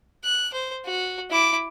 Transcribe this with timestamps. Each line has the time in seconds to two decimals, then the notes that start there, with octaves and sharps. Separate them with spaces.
0.24 F#6
0.53 C5
0.85 F#4
1.30 E4 D6